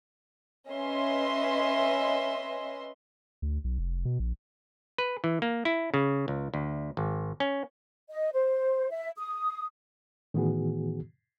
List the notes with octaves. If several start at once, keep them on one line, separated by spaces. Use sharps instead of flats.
C#4 B4 D#5 E5 C6
D2
B1
F1
B2
A#1
B4
E3
A#3
E4
C#3
C#2
D2
G#1
C#4
D#5
C5
E5
D#6
A2 D#3 E3 B3 F#4 G#4